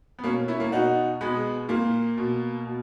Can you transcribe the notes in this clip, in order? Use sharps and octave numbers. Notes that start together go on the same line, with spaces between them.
B3
B2 A#3 C#4
C#4 E4
A#3 C#4
B2 D#4 F#4
B2 G#3 B3
A#2 A#3
B2
B2